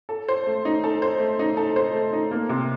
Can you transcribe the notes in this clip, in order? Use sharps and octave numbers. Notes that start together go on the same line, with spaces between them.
A4
C5
A3
D#4
A4
C5
A3
D#4
A4
C5
A3
D#4
A#3
C3